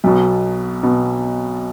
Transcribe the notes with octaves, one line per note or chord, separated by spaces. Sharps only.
B1 B2
B2